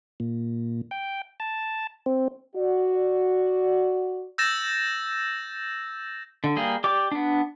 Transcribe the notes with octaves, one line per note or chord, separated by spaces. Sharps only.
A#2
G5
A5
C4
F#4 D5
E6 G6 A6 A#6 E7
D3
G3 A#3 G#4
G4 D5 D6
B3 D4